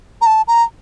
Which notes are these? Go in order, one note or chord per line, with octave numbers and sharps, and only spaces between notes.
A#5
A5
A#5